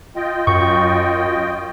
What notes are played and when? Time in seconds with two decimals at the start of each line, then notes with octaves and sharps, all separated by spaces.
0.16 F4 D#5 G5
0.47 F#2 C#6